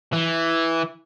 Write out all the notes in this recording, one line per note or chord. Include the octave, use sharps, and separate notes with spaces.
E3